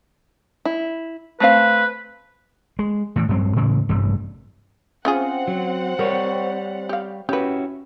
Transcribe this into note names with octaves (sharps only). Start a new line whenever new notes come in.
E4
A3 C4 B4 F5
G#3
A2 E3
G2 F#3 C4
A2 C#3 E3 G#3
A1 G2 C3 G3
C4 C#4 F4 G#4 F#5
F#3
G3 A#4 C#5
G4 F5
C#4 E4 F#4 G4 B4